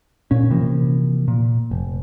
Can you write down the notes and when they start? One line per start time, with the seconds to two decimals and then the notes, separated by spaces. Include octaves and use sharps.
0.31 A#2 C#4
0.50 C3 E3 F3 A#3
1.28 A#2
1.71 F1